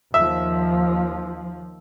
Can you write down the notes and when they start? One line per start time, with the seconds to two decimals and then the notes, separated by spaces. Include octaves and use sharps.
0.14 D#2 F3 E5